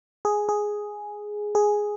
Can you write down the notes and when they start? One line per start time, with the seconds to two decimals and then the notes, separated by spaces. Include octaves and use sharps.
0.25 G#4
0.49 G#4
1.55 G#4